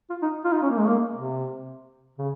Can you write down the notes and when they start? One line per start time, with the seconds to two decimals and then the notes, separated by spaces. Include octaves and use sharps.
0.10 F4
0.22 D#4
0.45 F4
0.53 D#4
0.62 C#4
0.70 A#3
0.79 G#3
0.87 A#3
1.14 C3
2.18 C#3